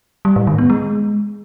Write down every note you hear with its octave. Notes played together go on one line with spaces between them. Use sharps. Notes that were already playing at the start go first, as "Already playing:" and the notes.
G3
A2
D#3
B3
G#3